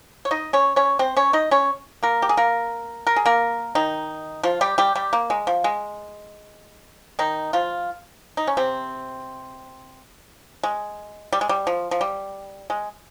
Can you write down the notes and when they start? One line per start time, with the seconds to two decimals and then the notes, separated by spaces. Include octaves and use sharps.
0.25 C#5
0.31 D#4 D#5
0.53 C#4 C#5
0.76 C#4 C#5
0.99 C4 C5
1.17 C#4 C#5
1.33 D#4 D#5
1.51 C#4 C#5
2.03 A#3 A#4
2.22 G4
2.29 G#4
2.37 A#3 A#4
3.07 A#4
3.16 G#4
3.26 A#3 A#4
3.75 D#3 D#4
4.43 F3 F4
4.61 G3 G4
4.78 G3 G4
4.95 G3 G4
5.13 A#3
5.30 G#3
5.47 F3
5.64 G#3
7.19 D#3 D#4
7.53 F3 F4
8.37 D#4
8.47 C#4
8.57 C3 C4
10.63 G#3
11.32 G3
11.41 G#3
11.49 G3
11.67 F3
11.91 F3
12.01 G3
12.70 G#3